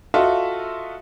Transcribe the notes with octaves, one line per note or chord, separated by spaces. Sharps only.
F4 F#4 A4 D#5 E5